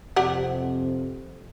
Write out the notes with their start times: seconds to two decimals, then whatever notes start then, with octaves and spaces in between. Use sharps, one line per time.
0.16 F2 C3 G4 D5 F#5